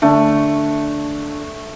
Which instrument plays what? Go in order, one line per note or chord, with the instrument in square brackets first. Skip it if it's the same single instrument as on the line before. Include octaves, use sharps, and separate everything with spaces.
[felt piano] D3 D4 [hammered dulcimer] A3